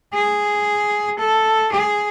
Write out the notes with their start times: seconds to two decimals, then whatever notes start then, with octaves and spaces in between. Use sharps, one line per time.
0.14 G#4
1.20 A4
1.73 G#4